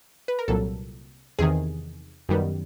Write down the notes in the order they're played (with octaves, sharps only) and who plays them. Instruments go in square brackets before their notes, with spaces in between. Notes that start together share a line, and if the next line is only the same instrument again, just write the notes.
[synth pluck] B4
A#4
C2 A#2 F#3 A4
E2 C3 D#3 G#4
F#2 D#3 G3 B3